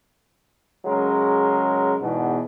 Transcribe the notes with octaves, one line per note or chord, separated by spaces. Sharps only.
C#3 F#3 G#3 A#4
E2 G#2 B2